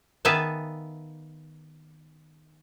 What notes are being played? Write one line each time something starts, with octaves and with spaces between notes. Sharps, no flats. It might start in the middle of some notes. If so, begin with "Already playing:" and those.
D#3 B3 E5 F5 G#5 A5